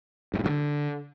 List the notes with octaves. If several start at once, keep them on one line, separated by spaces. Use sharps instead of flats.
G2
A2
G2
D3